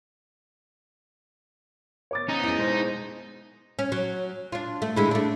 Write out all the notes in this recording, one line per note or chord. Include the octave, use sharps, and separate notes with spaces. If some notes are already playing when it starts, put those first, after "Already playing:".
C#5 D6 A6
B3 C#4 D#4
E4 G#4
B2 G#3 C5
C#4
F#3
D4 F4
A3
D3 G#3 E4
A3 D4